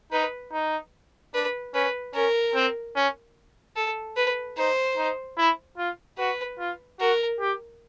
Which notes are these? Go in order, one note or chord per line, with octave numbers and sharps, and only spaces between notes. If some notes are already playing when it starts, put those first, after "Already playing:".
D#4 B4
D#4
D4 B4
C#4 B4
C#4 A#4
C4
C#4
A4
B4
D#4 C5
D#4
E4
F4
F#4 B4
F4
F#4 A#4
G4